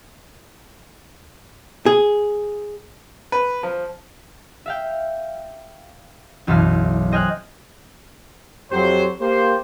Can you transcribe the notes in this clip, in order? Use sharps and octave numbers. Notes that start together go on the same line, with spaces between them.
G#4
B4
F3
E5 F5 G5
F#1 B1 E3 A4 F5 F6
C5 D#5 G5 G#5 F6 F#6
F2 F#3 G4 C5
A#3 G4 C5